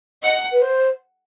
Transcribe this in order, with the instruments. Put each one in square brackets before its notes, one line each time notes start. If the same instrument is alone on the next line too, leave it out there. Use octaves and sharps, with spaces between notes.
[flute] D#5 [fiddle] F#5
[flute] B4
C5